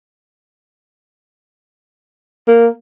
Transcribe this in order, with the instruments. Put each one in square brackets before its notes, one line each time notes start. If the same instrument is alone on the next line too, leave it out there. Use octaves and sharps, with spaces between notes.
[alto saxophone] A#3